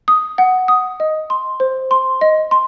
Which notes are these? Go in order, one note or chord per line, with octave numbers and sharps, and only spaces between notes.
D#6
F#5
D#6
D#5
C6
C5
C6
D#5
C6